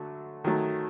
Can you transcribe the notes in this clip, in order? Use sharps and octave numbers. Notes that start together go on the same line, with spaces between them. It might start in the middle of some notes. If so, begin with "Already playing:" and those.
Already playing: D3 F#3 A3
D#3 F#3 A3